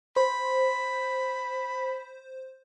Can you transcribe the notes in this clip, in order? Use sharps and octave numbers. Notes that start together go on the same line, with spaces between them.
C5 B5